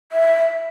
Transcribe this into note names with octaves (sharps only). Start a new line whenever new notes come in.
E5